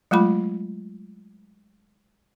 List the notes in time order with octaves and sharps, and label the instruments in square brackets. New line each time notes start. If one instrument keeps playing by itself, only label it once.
[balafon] F#3 G#3 A3 F4 B5